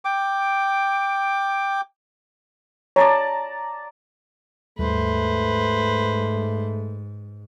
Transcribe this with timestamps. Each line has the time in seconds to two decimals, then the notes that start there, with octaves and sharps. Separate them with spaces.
0.05 G5 D6
2.96 C#5 D5 A5 A#5
4.79 D#2 G#2 G3 A3 B4 C5